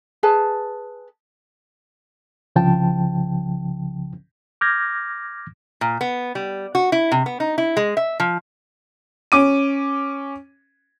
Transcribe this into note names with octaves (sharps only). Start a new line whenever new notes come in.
G#4 B4 A5
C2 C#3 F3 G5 A5
D6 F6 G6 G#6 A#6
A#2
B3
G3
F#4
E4
C3
B3
D#4
E4
G#3
E5
F3
C#4 D6 D#7